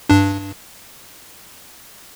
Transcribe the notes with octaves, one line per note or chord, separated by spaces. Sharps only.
G2 D4